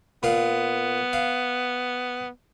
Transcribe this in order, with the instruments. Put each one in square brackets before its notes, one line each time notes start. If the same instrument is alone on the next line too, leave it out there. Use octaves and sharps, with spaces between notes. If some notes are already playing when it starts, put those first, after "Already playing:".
[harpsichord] A#2 F5 F#5 [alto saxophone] B3
[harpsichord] F5